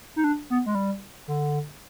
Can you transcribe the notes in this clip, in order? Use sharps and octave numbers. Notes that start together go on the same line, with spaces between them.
D#4
D4
B3
G#3
G3
D3